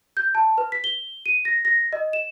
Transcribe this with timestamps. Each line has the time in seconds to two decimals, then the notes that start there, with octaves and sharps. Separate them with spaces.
0.17 G6
0.35 A5
0.58 B4
0.72 B6
0.84 G7
1.26 D#7
1.45 A#6
1.65 A#6
1.93 D#5
2.13 E7